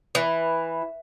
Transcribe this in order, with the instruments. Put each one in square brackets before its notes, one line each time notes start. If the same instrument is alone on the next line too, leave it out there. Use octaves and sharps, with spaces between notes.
[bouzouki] E3